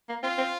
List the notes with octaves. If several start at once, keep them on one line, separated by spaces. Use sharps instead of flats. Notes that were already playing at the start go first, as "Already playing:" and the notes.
A#3
C4 F4
C4